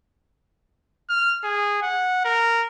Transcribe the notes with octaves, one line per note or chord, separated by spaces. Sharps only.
F6
G#4
F#5
A#4